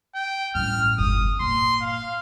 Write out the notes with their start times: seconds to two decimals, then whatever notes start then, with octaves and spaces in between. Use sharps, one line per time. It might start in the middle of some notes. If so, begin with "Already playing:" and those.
0.15 G5
0.55 A1 G2 F6
0.98 G1 E2 D#6
1.40 A#2 C6
1.82 F5